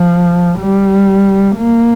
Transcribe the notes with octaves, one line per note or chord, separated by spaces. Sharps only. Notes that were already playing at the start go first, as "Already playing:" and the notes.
Already playing: F3
G3
A#3